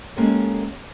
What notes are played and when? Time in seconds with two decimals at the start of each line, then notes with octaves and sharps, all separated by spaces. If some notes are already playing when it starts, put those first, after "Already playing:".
0.17 G#3 A#3 C#4 G4 A4 C#5